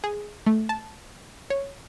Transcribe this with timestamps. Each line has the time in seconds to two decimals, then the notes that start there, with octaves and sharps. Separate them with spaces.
0.04 G#4
0.46 A3
0.69 A5
1.50 C#5